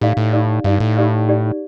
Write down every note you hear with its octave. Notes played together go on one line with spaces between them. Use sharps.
A2 D#4 G4 D5 F5
A2
D#4 G4 D5 F5
G2 D#4 G4 D5 F5
A2
D#4 G4 D5 F5
D#4 G4 D5